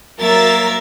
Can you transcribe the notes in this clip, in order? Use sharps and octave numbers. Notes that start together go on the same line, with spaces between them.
F#3 A#3 A#4 E5 A6